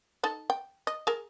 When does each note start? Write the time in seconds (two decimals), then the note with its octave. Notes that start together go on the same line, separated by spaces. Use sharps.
0.23 D#4 A4 A5
0.50 G5
0.87 D#5
1.07 G#4 A#4